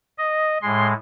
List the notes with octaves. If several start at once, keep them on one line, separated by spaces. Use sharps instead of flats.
D#5
A2 G#3 C6